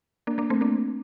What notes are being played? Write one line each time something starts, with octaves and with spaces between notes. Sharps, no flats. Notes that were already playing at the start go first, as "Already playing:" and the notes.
A#3 D4
A#3 D4
A3 C4
A#3 D4